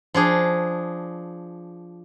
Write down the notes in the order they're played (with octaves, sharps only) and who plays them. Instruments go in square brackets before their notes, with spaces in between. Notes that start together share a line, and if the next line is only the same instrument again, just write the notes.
[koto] F3 D4 G#4